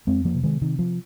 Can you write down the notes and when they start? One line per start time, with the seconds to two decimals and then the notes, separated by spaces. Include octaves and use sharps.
0.07 F2 G#3 C4
0.25 F3 A#3
0.35 C3
0.43 D#3 G#3
0.61 C3 D#3
0.79 F3